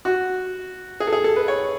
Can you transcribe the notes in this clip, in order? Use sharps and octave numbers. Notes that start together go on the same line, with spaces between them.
F#4
G#4
A4
G#4
A4
B4
C#5